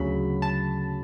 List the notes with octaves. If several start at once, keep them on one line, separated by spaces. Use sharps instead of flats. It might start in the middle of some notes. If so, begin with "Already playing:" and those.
Already playing: D2 C#3 F#3 B5
A5